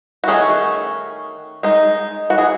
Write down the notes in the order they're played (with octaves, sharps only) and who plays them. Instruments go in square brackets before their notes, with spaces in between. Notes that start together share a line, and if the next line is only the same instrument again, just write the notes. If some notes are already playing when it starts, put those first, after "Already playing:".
[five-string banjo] F#4
D#3 A3 C#4 G#4
G#3 D#4
F#4
G#4